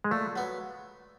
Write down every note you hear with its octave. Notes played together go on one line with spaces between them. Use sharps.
G#3
A#2 A3
F#3 B3